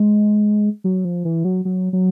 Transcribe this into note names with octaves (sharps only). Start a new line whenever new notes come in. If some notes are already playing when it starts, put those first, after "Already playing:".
Already playing: G#3
F#3
F3
E3
F#3
F#3
F#3